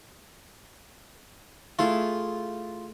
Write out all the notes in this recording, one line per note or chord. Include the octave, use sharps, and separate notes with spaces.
A3 E4 F4 G#4